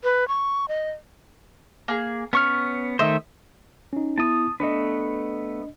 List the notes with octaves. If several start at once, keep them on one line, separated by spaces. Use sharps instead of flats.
B4
C#6
D#5
A#3 G#4
B3 C#4 C#6 F6
D#3 A3 C5 D#5 E5
C#4 D#4
B3 E4 A5 D#6
A3 B3 D4 B4 D#5